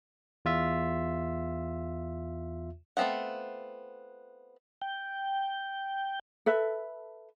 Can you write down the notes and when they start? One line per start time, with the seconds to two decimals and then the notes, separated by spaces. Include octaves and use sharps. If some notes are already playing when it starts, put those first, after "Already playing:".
0.45 E2 F4 E5
2.97 A3 B3 C4 F4 F#5
4.82 G5
6.46 A4 B4 E5